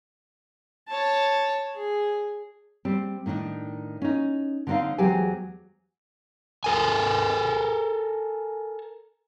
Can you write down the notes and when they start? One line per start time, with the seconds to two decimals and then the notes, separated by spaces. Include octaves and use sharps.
0.88 C#5 A5
1.75 G#4
2.85 G3 C4
3.26 A2 D#3 C4 D4 D#4
4.02 C#4 D#4
4.67 D3 G#3 C4 D#4 F5
4.98 E2 F#3 G#3 G4 C5 G#5
6.64 A4 A#4 G#5